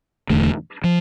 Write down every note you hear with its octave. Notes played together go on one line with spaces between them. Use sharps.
E1 E2 D3 A3
F3